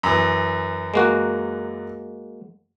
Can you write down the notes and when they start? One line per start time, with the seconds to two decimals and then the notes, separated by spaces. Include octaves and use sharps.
0.03 F#2 E3
0.94 G#3 A#3 F#4